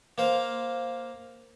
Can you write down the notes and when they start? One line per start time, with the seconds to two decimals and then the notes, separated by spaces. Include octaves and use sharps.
0.18 A#3 C5 F5